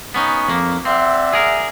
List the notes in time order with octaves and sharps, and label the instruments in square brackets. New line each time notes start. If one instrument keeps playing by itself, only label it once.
[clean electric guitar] B3 C#4 D#4
F2 A#3
[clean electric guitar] C4 [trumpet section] D5 E5 F#5
[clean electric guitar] G#4 A#4